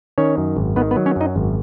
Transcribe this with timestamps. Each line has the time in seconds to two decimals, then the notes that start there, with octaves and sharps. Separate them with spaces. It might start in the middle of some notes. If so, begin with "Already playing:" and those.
0.18 D#3 C#4 C#5
0.37 F#2
0.57 G#1
0.76 D#3 B3 B4
0.91 B3 B4
0.97 F#3
1.06 C#4 C#5
1.16 F#2 D#4 D#5
1.36 G#1